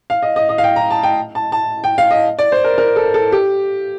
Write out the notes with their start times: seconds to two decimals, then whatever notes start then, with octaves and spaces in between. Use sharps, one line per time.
0.10 F5
0.22 D#5
0.36 D#5
0.49 D#5
0.58 F5
0.64 G5
0.76 A#5
0.91 A5
1.03 G5
1.35 A5
1.52 A5
1.84 G5
1.98 F5
2.11 D#5
2.39 D5
2.52 C5
2.64 A#4
2.78 A#4
2.96 A4
3.14 A4
3.32 G4